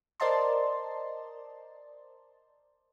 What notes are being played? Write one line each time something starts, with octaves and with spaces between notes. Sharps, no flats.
A#4 C5 D5 D#5 A5 C6